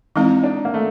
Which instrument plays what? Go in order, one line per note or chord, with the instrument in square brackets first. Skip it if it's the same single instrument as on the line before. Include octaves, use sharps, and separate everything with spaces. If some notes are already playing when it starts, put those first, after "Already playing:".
[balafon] E3 G#3 C4 E4 [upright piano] D#4
[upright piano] D4
A#3
A3